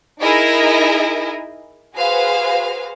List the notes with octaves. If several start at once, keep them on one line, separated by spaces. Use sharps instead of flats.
D#4 E4 G#4 A#4 D#5
F#4 G#4 B4 C5 F5